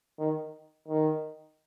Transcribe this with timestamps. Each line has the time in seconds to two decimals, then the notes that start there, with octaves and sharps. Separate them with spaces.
0.19 D#3
0.88 D#3